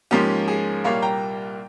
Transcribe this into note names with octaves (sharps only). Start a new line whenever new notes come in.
G#2 F3 A#3 C#4 G4
G#4
C2 A#2 G3 A#3 C#5 F5
G5 A#5